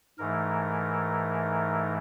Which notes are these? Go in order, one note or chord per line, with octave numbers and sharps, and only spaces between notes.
G#2 E3 A3 A#4